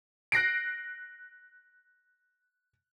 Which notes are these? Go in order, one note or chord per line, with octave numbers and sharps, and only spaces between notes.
F#6 A#6 C7 D7